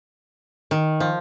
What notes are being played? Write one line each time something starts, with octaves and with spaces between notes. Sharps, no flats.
D#3
F3